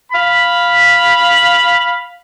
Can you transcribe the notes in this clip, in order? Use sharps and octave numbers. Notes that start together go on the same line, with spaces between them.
F5 B5